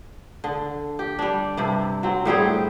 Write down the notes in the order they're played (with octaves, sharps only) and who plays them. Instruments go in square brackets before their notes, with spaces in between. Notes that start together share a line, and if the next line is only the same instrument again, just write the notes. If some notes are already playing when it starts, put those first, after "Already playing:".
[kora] D3
G4
G3 D4
G2 C3
F#3 C4
A2 G3 C4 G#4